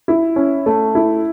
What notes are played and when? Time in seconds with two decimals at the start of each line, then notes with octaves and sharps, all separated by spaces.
0.08 E4
0.36 C#4
0.66 A3
0.95 E4